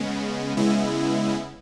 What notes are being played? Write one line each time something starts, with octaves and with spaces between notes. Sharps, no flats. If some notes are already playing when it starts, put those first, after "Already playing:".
Already playing: C#3 G#3 B3
C#3 G#3 B3 E4